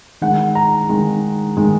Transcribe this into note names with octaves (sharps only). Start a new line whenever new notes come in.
D#3 G#3 F#5
A#5
D#3 G#3
D#3 G#3